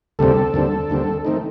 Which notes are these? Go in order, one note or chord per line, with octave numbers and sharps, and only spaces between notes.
D2 C3 G3 C4 A4
D#2 D3 G3 C4
D#2 D3 G3 C4
D#3 A3 C4 D#4